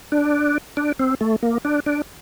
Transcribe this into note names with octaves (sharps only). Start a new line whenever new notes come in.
D4
D4
C4
A3
A#3
D4
D4